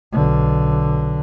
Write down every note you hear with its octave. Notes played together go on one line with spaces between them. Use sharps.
B1 D3